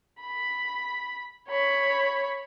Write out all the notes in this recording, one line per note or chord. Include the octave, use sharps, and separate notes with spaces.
B5
C#5 B5